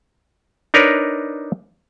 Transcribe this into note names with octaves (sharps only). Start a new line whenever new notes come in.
D4 D#4 A#4 B4 C#5